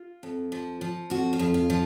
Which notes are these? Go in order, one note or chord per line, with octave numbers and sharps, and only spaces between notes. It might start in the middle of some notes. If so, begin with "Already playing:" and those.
Already playing: F4
F2
F3
F3
F2 F#4
F4
F2
F4
F3